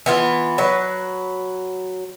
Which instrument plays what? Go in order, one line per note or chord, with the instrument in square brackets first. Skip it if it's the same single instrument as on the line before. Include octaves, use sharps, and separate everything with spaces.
[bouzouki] E3 B3 F4
F#3 B4